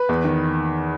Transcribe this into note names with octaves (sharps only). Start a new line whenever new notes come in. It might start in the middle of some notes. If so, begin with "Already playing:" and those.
Already playing: B4
E2
D#3